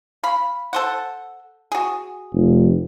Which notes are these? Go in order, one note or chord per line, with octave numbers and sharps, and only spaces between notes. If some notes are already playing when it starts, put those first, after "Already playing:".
F5 B5
A4 C5 F#5
F#4 G#4
F1